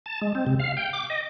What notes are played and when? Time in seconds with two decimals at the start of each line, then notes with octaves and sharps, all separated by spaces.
0.06 A5
0.22 G#3
0.35 C4
0.47 C3
0.60 F5
0.77 G5
0.93 D6
1.10 D#5